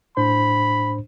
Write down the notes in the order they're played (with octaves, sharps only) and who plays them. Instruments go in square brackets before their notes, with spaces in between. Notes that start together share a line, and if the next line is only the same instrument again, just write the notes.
[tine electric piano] A2 D4 C5 [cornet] B5